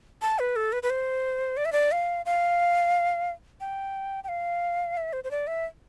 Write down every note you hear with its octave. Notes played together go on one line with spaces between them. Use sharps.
A5
B4
A4
B4
B4
C5
D5
E5
D5
F5
F5
G5
G5
F5
E5
C5
C5
D5
E5